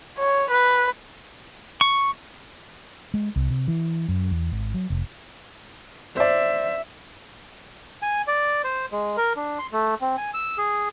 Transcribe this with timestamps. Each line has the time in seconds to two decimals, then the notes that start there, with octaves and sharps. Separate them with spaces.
0.18 C#5
0.51 B4
1.81 C#6
3.14 G#3
3.36 C2
3.50 C3
3.68 E3
4.08 F#2
4.31 E2
4.52 G#1
4.74 F#3
4.90 F1
6.17 C5 D5 E5
8.02 G#5
8.28 D5
8.64 C5
8.92 G#3
9.17 A#4
9.36 D4
9.59 C6
9.72 A3
10.01 C4
10.18 G#5
10.34 E6
10.58 G#4